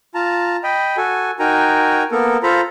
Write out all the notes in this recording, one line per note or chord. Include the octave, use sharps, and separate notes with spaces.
F4 A5 A#5
D#5 G5 B5
F#4 A4 G#5
D#4 F#4 A#4 G5 G#5 A#5
A#3 B3 A4 A#4
F4 A4 C5 A#5 B5